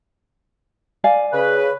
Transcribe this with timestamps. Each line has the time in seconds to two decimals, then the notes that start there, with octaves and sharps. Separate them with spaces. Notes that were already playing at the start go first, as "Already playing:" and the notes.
1.04 D5 F5 G#5
1.33 C#3 B4